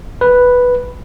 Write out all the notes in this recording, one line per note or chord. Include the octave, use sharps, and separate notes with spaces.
B4